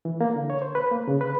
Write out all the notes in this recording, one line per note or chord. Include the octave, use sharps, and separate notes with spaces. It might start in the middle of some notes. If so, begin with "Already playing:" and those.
E3
A#3
D3
C#5
C5
B4
A#3
C#3
B4